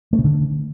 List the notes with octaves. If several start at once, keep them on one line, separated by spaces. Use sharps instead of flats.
A3
C#3
D3